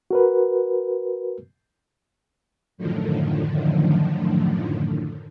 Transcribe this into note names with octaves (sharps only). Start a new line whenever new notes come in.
F#4 A#4 B4
F#2 A2 D3 D#3 F3